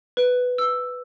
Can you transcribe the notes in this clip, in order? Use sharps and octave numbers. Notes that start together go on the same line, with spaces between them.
B4
E6